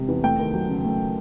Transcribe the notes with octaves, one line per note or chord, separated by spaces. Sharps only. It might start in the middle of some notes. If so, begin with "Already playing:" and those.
Already playing: E1 C3
E2
A3 G5
D#2
F#3
C#3
A3